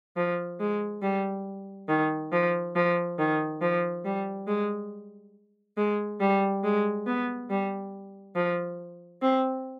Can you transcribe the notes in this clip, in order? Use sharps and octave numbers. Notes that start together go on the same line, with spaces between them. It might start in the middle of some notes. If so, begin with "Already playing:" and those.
F3
G#3
G3
D#3
F3
F3
D#3
F3
G3
G#3
G#3
G3
G#3
B3
G3
F3
C4